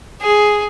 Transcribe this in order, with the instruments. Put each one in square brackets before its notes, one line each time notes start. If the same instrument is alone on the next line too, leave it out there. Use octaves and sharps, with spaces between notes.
[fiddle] G#4